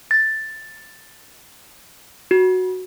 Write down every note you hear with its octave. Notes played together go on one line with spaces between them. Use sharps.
A6
F#4